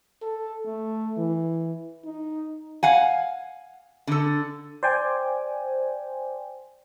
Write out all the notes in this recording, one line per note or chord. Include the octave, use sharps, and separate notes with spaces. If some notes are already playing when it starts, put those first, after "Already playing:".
A4
A3
E3
D#4
F5 F#5 G#5
D3 A4
C5 D5 G5 G#5